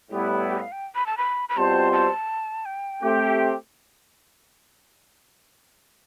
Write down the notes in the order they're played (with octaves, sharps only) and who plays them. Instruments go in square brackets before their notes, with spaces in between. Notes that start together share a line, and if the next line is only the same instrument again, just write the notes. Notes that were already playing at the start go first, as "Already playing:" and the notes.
[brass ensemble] A2 G3 B3 E4 [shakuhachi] G4
[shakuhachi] G4
F5
G5
B5
A5
B5
B5
[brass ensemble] B2 G3 C4 F4 C5 [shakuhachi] A5
[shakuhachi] A5
G5
[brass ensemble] A3 C4 G4